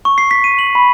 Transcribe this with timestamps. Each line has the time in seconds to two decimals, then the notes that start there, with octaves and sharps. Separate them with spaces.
0.05 C#6
0.18 C7
0.31 B6
0.44 D#7
0.59 F#7
0.75 B5